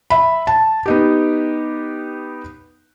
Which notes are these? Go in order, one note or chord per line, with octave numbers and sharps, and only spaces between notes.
E5 B5
A5
B3 D#4 G4